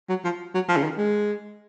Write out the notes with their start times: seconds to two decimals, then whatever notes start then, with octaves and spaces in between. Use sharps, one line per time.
0.09 F#3
0.24 F3
0.54 F#3
0.68 F3
0.77 C#3
0.83 D#3
0.98 G#3